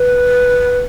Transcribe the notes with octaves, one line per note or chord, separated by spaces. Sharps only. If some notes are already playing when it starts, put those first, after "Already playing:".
Already playing: B4